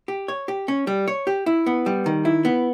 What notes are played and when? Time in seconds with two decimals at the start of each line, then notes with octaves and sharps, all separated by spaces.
0.08 G4
0.28 C#5
0.48 G4
0.68 C#4
0.87 G3
1.08 C#5
1.27 G4
1.46 E4
1.66 B3
1.86 G3
2.06 D#3
2.25 E4
2.45 B3